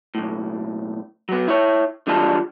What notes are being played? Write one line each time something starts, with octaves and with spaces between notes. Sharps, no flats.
B1 A2
F#3 B3
E4 C#5
D3 E3 G3 G#3 F4 A5